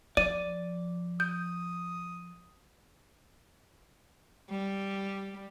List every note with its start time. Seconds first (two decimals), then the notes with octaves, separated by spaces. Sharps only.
0.17 F3 D5 D#7
1.20 D#6 G6
4.50 G3